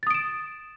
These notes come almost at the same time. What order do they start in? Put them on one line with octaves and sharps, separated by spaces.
A6 D#6 D7 E7